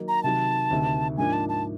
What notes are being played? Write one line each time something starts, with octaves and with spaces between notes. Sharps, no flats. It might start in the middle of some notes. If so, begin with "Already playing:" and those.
Already playing: D#3 F#3 A#3 D#4
A#5
C3 D#3 F#3 A5
D2 C3 D#3
G#2 F3 A#3 D4 G#5
A5
A5